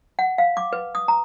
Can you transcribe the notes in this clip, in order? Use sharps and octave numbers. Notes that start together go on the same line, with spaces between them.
F#5
F5
D6
B4
D#6
A#5